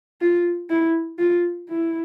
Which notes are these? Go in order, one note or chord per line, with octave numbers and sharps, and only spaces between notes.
F4
E4
F4
E4